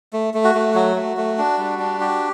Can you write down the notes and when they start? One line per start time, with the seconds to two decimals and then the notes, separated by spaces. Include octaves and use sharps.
0.13 A3
0.34 A3
0.44 F#4
0.55 A3
0.75 F#3 F#4
0.96 A3
1.17 A3
1.38 D4
1.58 G3
1.79 D4
2.00 F#4 G4